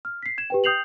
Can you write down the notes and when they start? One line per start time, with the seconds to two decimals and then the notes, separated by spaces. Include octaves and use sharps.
0.05 F6
0.23 B6 C7
0.38 G#6 E7
0.50 G4 B4 G5
0.64 G5 D#6 G6 C7 F7 F#7